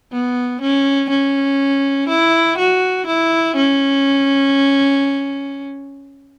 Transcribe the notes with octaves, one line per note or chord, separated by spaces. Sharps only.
B3
C#4
C#4
E4
F#4
E4
C#4